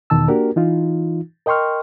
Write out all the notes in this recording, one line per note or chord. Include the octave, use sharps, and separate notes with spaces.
E2 B2 D#3 A5 E6
A#3 D4 F#4 G4 A#4
E3 D#4 F4
A#4 D#5 G5 C6 C#6 F6